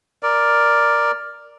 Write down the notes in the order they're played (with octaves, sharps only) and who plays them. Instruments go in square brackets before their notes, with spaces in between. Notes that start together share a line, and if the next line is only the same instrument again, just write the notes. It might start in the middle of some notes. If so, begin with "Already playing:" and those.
[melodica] A#4 D5